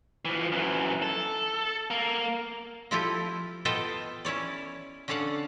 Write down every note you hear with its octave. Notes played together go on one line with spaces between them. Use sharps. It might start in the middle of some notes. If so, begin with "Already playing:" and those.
E3 F3
F#2 E3
A4
A#3
F3 C4 E4 F4 G4 A4
B3 F4 A4 D#5 G5 A5
C#4 E4 C#5 D5
D3 C#4 A4 D5 F5 F#5